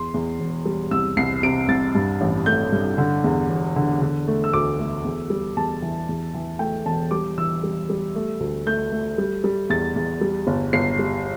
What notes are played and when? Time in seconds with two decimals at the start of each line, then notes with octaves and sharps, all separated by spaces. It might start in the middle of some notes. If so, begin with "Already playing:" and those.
Already playing: E2 C6
0.14 E2
0.40 E1
0.65 G3
0.91 C2 E6
1.17 C2 C7
1.43 C3 D7
1.68 C2 A6
1.95 G2
2.21 A1
2.46 A3 G6
2.72 G2
2.98 D3
3.24 E2
3.50 E1
3.76 D3
4.02 D3
4.28 A3
4.44 E6
4.53 D2 D6
4.79 A3
5.05 E2
5.30 G3
5.57 E2 A5
5.82 E3
6.09 E2
6.34 E3
6.59 A3 G5
6.86 E1 A5
7.11 G3 D6
7.38 E3 E6
7.64 G3
7.90 G3
8.15 A3
8.40 D2
8.66 A3 G6
8.92 A3
9.18 G3
9.44 G3
9.70 E2 A6
9.96 E2
10.21 G3
10.47 G1
10.73 G1 C7
10.99 G3